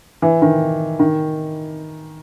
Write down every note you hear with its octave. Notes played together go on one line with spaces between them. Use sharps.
E3
D#3
D#3